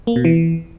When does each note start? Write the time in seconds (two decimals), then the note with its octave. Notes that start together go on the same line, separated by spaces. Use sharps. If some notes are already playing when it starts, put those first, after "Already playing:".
0.07 A#3
0.16 B2
0.25 E3